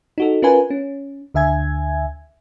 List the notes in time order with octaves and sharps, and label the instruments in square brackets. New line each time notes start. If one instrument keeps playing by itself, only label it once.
[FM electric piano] D#4 F#4 A4
C#4 F4 A#4 B4 G#5
C#4
D2 D3 E5 G#5 G#6